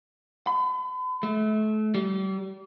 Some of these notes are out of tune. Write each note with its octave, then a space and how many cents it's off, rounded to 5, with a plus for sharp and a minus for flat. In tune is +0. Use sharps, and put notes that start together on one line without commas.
B5 +40
A3 -35
G3 -40